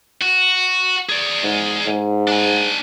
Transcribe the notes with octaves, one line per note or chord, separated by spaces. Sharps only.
F#4
G#4 D5
G#2
G#2
D4 G#5